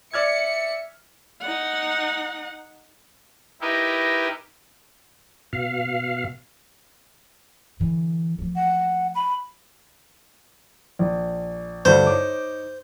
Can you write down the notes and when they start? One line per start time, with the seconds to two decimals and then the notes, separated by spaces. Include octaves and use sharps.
0.14 D5 E5 F6 G#6 C#7
1.41 D#4 F#5
3.61 D#4 E4 G4 A#4 B4
5.53 B2 F5
7.80 D3 E3
8.38 F3 A3
8.56 F#5
9.15 B5
10.99 A#1
11.85 G1 D2 G2 C5
12.07 D#4 C#5 D6